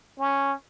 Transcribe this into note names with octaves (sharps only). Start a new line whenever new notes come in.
C#4